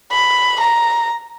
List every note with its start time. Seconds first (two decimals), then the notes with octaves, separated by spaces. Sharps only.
0.12 B5
0.61 A#5